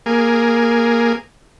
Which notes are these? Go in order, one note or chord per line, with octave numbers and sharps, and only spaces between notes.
A#3 G#4